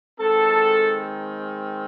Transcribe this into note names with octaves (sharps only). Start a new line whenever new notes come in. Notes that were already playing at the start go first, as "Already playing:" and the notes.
D#3 G#3 C4 A4